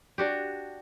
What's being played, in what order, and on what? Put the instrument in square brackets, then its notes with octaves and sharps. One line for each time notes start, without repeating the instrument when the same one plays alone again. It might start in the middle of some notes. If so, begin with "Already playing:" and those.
[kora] D4 F#4 G4